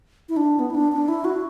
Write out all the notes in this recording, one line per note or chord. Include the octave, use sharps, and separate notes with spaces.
E4
D4
B3
E4
D4
D4
E4
F#4